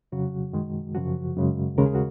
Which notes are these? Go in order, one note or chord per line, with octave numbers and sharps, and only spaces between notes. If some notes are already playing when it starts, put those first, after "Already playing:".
F2 C#3 F#3 F#4
F#2 D#3 G#3
F#2 C#3 F3 F#4
F#2 C#3 G#3
D#2 C#3 G#3 A#4
G#4
F#4